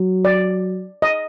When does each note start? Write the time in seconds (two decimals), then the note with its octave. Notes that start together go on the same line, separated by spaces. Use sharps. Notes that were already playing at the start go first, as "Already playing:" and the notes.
Already playing: F#3
0.25 D5
1.02 D#5